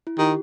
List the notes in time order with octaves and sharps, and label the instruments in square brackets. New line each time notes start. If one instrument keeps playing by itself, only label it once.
[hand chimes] E4
[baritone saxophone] D#3 [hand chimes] G4